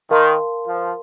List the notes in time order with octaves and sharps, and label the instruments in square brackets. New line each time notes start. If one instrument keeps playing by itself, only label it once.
[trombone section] D#3 [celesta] A#4 F5 A5 C6
[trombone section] F3